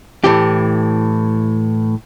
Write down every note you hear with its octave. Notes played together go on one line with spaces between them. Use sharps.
A2 E3 G4